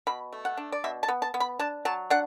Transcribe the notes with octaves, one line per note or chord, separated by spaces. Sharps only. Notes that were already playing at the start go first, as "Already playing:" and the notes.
B2 B5
A3
F#5
D4
D5
B2 E5
A5
B3
A5
B3
B5
D4 A5
F#3 A5
D4 F#5